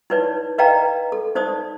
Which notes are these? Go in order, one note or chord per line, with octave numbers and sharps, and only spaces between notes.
D#4 E4 B4 C#5 D5
B4 D5 D#5 F5 G5 A#5
A4
D#4 C5 D5 D#6